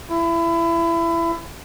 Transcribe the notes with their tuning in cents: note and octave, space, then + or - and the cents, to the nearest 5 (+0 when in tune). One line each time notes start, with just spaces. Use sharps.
E4 +25